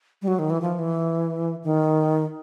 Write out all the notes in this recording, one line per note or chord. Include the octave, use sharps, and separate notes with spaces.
G3
F#3
D#3
E3
F3
E3
D#3